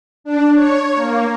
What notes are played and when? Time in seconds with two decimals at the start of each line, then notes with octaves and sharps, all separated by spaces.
0.24 D4
0.54 C#5
0.96 A#3